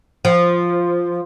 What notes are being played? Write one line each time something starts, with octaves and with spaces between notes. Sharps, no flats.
F3